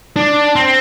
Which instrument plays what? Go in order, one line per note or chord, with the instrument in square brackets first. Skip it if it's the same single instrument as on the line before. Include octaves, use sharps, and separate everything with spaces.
[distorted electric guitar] D4
C4